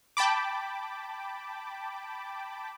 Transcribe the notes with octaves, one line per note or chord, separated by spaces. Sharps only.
G5 A5 B5 D6